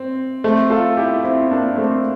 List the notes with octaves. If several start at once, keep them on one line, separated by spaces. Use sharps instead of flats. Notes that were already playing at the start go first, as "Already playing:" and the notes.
Already playing: C4
A3 C4
F4 A4
E4 G4
C4 E4
A#3 D4
A3 C4